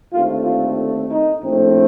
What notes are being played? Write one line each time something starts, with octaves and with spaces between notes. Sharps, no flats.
D#2 D3 A3 C4 F4
F4
D#4
A#1 A2 A3 C4